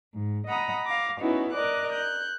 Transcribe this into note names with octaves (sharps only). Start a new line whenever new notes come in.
G#2
D#5 F#5 A#5 B5 D#6
F5 D6 A#6
B3 C#4 D#4 E4 F#4
A#4 D5 D#5 D6 F#6
F#6 G6